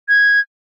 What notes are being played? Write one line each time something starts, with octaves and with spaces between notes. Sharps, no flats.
G#6